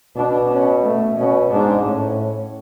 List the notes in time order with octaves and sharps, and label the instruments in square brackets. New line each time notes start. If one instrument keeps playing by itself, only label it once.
[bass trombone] B2 [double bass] D4
[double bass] C#4
A3
[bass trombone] B2 [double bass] C#4
[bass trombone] G#2 [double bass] D4
[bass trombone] A2 [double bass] C#4